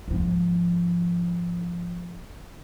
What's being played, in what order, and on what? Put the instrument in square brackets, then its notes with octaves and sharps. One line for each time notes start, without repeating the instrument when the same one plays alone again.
[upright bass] G#2 F3